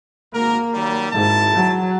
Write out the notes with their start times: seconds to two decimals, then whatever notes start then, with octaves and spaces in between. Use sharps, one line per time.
0.34 G#1 A#3 F#4 A#4
0.74 D#3 F#3 G3
1.12 G#1 G#2 E4 A5
1.55 F#3